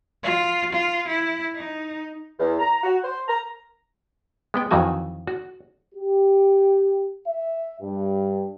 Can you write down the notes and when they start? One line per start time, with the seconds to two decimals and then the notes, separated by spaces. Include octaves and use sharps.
0.23 F4
0.73 F4
1.08 E4
1.55 D#4
2.39 E2
2.60 A#5
2.83 F#4
3.04 C5
3.28 A#5
4.54 G#3 B3 G5
4.71 F2 D#3 E3 F#3 F#4 G#5
5.27 F#4
5.95 G4
7.26 E5
7.81 G2